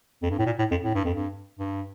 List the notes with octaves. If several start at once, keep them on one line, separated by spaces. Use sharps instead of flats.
F2
G2
A2
A#2
A2
F2
A2
G2
F2
G2
G2